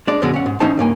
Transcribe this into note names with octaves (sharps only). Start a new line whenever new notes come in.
G#3 D4 D5
F#2 B2 D3 F#3 G#3
C#4 F#5
G#2
G#2 E3 C#4 D#4 C5 A5
C#2 G2 A#3 G#5